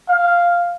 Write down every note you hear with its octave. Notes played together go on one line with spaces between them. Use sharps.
F5